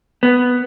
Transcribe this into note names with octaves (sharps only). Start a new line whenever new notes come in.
B3